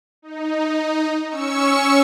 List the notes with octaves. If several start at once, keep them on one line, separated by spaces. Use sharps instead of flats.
D#4
C#4 C#6 E6 C#7